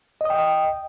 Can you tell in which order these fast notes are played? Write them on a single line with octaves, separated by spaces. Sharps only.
D#5 D#6 G5